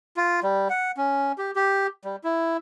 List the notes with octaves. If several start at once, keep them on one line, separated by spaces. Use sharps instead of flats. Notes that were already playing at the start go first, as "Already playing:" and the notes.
F4
G3
F#5
C#4
G4
G4
G3
E4